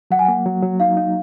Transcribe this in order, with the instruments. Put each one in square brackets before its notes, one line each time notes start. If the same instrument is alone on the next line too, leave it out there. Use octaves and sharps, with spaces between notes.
[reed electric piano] F#3 [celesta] F#5
[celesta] G#5
[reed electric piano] A#3 [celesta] F#5
[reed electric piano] F#3
F#3
[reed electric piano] D#4 [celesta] F5
[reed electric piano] D#4